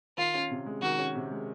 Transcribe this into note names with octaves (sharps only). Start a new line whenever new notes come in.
D#3 F4
C#4
C3
G#3
D#3 F#4
C#4
C3
G#3